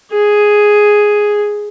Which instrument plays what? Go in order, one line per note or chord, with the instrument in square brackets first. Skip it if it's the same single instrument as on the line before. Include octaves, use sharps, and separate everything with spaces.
[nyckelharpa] G#4